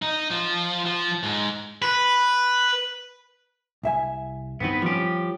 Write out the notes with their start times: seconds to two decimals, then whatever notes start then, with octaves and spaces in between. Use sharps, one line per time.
0.02 D#4
0.31 F3
0.85 F3
1.23 G#2
1.82 B4
3.83 C2 E5 G#5
4.60 G2 D#3 B3 C4 B4
4.82 F3 G3 C#4 G4